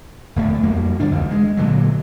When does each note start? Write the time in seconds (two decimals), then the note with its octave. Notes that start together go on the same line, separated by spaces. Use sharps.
0.36 D1 A2 A3
0.63 F2 G3 A#3
1.00 F#2 D3 D4
1.11 C#2 D#3
1.31 G#3
1.57 A#2 D3 F#3